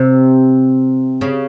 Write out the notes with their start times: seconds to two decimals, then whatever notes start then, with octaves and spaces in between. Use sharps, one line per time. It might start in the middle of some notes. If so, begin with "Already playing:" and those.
Already playing: C3
1.21 C#3